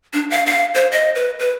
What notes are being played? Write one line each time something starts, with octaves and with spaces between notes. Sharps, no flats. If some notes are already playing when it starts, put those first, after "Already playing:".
D4
F5
F5
C5
D#5
B4
B4